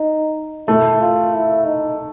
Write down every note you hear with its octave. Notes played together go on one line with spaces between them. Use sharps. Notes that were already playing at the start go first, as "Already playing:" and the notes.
Already playing: D#4
A3 E4
F4
E4
D#4